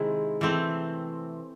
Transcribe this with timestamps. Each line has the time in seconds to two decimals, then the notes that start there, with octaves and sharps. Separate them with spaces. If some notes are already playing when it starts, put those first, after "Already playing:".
Already playing: C3 D#3 G#3 C4 E4
0.41 E3 A3 C4